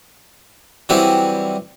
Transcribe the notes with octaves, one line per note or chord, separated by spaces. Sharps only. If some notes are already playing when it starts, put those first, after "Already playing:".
E3 F#3 G3 C4